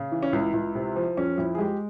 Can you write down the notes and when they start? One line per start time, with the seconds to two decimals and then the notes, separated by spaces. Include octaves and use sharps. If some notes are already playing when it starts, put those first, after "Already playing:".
Already playing: C#3
0.12 E3
0.23 C#4
0.33 C#2 E4
0.53 C#2
0.75 C3
0.96 F3
1.17 F2 C#4
1.38 F2 E4
1.55 G#4
1.58 G#3 G4